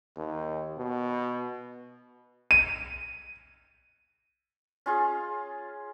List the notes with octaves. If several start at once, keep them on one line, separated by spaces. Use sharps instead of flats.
D#2
B2
D#7
C#4 F4 G#4